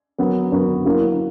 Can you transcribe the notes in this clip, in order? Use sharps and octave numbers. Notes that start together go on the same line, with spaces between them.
F#3 B3 F#4 A#4
F#3 B3 F#4 A#4
F#3 A#3 E4 A#4